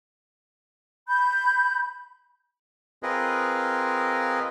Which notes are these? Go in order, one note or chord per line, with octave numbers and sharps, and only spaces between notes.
B5 G6
C4 F4 G#4 A#4 B4 D#5